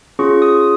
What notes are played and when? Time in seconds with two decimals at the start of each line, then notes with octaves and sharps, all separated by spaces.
0.19 C#4 F4 G#4 C#6
0.42 D#6